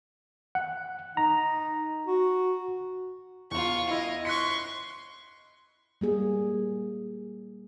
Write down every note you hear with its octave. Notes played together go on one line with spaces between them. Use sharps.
F#5
D#4 A#5
F#4
E2 F4 C#6
E4 D#5
C6 C#6 F#6 B6 C#7
G3 A#3 G#4